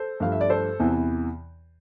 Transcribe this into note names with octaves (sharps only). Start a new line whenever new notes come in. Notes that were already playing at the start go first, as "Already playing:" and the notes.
Already playing: A4 C5
G2 F3 A3 F5
E5
D5
A4 C5
E2 C3 E3